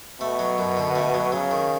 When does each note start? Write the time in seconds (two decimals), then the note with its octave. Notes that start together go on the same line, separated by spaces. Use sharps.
0.20 B2 A3
0.39 F#3
0.58 F#2
0.77 D3
0.96 A3
1.14 F#3
1.32 C#3 F#3
1.51 D#3